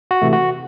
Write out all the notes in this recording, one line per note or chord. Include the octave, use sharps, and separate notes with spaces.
F#4
C3 E3 A3
F#4